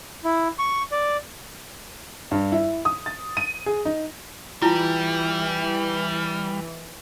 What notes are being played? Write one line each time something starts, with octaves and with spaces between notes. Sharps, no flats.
E4
C#6
D5
G2
E4
D#6
A6
D#7
G#4
D#4
E3 G3 E4 F4 A5